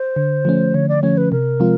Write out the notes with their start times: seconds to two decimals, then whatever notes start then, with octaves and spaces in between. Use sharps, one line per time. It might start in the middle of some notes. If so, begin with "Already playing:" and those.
Already playing: C5
0.16 D3
0.45 F3 A3 C#4
0.74 D3 C#5
0.89 D5
1.02 F3 A3 C#4 C#5
1.17 B4
1.32 C3 A#4
1.60 F3 G#3 C4 F4